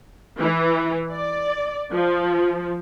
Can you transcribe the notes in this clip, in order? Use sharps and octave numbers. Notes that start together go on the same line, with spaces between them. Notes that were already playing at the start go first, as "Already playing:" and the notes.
E3
D5
F3